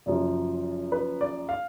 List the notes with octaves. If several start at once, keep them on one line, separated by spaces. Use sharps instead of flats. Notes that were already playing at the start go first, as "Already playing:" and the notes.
F#1 F#2 F3
B4
D5
F5